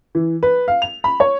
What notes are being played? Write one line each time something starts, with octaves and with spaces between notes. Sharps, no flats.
E3
B4
F5
F7
B5
C#5